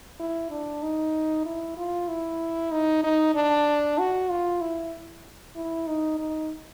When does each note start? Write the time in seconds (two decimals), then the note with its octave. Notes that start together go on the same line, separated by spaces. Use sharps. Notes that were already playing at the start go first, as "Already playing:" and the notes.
0.20 E4
0.51 D4
0.83 D#4
1.45 E4
1.77 F4
2.08 E4
2.71 D#4
3.03 D#4
3.35 D4
3.98 F#4
4.30 F4
4.61 E4
5.56 E4
5.87 D#4
6.19 D#4